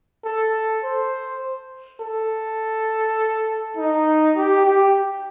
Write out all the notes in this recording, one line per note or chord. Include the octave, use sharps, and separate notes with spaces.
A4
C5
A4
D#4
G4
G4